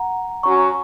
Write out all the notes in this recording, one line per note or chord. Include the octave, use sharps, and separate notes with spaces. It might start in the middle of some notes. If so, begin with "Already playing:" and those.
Already playing: F#5 A#5
F#3 C#4 F#4 C#5 A#5 C#6